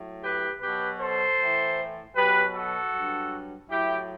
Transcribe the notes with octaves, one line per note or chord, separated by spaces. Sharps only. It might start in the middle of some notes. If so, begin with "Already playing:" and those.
Already playing: A2 F#3
G4 B4
B2 F#3 G4 B4
A4 C5
A2 E3
B2 F#3 G4 B4
F#4 A4
G2 F#3
A2 F#3 E4 G4